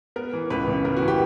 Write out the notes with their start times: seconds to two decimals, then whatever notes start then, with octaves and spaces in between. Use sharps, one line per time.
0.16 B3 A#4
0.33 E3
0.50 C#2 B4
0.68 C#3
0.84 B3 A#4
0.97 F#4
1.02 E3
1.08 G4